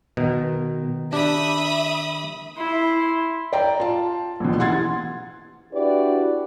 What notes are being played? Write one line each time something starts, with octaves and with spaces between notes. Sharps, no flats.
B2 D#3
D4 G4 E5 B5 D#6
E4 C6
D5 G5 A#5
F4 A5
A#1 B2
E3 G4 F#5 C6 G#6 A6
D4 E4 F#4 G4 B4 D5